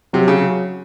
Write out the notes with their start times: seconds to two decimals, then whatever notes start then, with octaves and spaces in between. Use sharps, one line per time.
0.13 C3 F#3
0.28 C#3